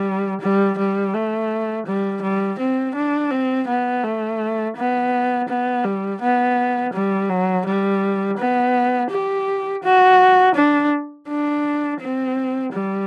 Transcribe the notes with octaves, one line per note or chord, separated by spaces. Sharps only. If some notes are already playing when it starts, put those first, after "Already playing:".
Already playing: G3
G3
G3
A3
G3
G3
C4
D4
C4
B3
A3
B3
B3
G3
B3
G3
F#3
G3
B3
G4
F#4
D4
D4
C4
G3